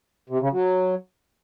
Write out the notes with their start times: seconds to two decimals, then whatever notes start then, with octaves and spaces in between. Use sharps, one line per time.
0.30 C3
0.41 C#3
0.52 F#3